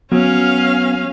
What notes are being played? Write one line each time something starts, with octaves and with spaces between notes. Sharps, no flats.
F#3 B3 C#4 F5